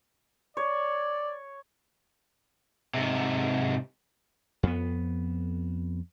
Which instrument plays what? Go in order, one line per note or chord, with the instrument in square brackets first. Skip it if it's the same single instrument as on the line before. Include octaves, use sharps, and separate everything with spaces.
[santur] C#5 [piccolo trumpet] D5
[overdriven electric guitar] G#2 C3
[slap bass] F2 B3